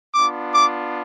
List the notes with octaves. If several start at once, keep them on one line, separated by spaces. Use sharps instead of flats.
B3 D4 F4 D6
D6